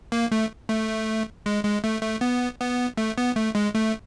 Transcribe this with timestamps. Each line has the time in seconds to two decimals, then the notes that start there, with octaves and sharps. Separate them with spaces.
0.12 A#3
0.32 A3
0.69 A3
1.46 G#3
1.64 G#3
1.84 A3
2.03 A3
2.21 B3
2.60 B3
2.97 A3
3.18 B3
3.36 A3
3.55 G#3
3.75 A3